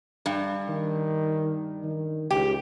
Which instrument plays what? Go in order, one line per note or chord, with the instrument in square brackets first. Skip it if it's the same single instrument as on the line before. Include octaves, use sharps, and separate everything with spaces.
[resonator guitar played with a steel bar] G2
[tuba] D#3
D#3
[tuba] C#2 [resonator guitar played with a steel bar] G4